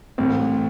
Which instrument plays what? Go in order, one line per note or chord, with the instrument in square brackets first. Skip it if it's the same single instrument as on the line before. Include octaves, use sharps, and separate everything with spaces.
[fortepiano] C2 C3 [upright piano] A2 E3 A3